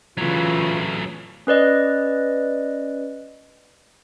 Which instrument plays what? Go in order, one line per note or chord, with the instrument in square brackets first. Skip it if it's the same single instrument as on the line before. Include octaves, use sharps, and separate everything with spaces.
[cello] C#3 E3 [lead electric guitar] F#3 A3 [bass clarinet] F4
[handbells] C#4 B4 D5 D#5